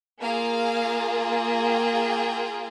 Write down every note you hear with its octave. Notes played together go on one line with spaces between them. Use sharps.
A#3 F4 G#4 F5
G5